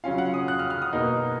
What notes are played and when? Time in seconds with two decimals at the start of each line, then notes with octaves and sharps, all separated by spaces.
0.04 C#3 F#3 C#4 F4 F5
0.18 F#5
0.34 D#6
0.48 F#6
0.59 F6
0.70 F6
0.82 D#6
0.93 B2 A#3 D#4